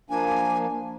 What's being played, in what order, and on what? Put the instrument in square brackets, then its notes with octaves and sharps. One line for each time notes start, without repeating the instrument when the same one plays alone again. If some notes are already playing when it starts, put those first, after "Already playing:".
[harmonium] F3 A#3 D4 [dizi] G#5